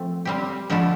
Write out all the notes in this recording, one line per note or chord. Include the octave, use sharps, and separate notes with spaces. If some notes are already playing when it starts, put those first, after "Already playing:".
Already playing: F3 A3 C4
G3 C4 G4
D3 F3 A3 E4 A4